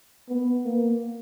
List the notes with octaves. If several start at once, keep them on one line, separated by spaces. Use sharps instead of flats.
B3
A#3